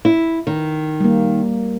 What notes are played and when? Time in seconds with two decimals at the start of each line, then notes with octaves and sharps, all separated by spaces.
0.05 E4
0.47 D#3
1.00 G3 A#3